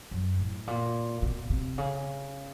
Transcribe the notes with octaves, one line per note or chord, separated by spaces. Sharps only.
F#2
A2
A#2
B2
C3
C#3